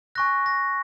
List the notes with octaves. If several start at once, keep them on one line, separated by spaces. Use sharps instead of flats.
G#5 C#6 F#6 A#6
A#6